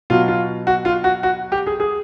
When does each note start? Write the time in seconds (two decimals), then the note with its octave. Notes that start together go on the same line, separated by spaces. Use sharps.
0.10 B2 F#3 F4
0.28 F4
0.67 F#4
0.85 F4
1.04 F#4
1.23 F#4
1.52 G4
1.67 G#4
1.80 G#4